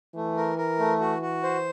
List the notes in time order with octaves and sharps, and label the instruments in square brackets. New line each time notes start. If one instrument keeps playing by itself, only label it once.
[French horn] E3 [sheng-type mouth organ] A3
[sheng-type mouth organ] A#4
A#4
A3
F#4
F#4
C5